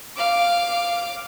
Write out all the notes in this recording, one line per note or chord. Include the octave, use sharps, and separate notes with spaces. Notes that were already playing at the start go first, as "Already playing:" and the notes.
F5 D6